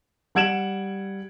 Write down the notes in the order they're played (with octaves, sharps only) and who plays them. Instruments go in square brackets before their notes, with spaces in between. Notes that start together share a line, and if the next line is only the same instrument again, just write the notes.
[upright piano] G3 F#5 G#6 D7 E7 F#7